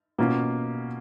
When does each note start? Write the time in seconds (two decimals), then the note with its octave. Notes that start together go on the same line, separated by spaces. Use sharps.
0.18 B2 A#3 C#4 F4